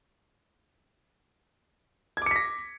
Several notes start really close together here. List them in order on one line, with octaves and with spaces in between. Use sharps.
G#6 D6 C#7 B6 A#6